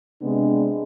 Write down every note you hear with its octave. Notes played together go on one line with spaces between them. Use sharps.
C3 G#3 B3 D4